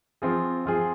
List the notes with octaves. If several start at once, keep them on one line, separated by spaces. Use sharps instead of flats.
F3 C4 F4 G#4
F3 C4 F4 G#4